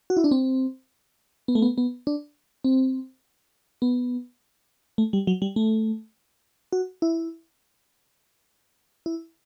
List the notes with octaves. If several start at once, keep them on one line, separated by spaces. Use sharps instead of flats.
F#4
E4
D4
C4
B3
A3
B3
B3
D4
C4
B3
A3
G3
F#3
G3
A3
F#4
E4
E4